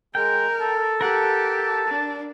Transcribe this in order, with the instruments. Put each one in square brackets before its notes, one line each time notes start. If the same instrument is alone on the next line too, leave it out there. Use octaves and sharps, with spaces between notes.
[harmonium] G#3 [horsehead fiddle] A#4 [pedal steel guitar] G5
[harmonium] A4 [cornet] A5
[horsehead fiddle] G4 [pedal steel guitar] A#4 F#5
[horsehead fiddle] D4